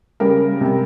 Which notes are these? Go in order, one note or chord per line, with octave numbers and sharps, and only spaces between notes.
C#3 G3 A#4
C3 G3